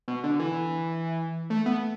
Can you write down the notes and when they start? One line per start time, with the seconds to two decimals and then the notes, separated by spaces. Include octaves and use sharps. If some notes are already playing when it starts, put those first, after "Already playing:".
0.08 B2
0.24 D3
0.39 E3
1.50 A3
1.66 B3